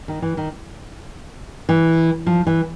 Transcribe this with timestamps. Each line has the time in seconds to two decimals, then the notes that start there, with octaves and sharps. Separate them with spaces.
0.08 D#3
0.22 E3
0.37 D#3
1.69 E3
2.26 F3
2.47 E3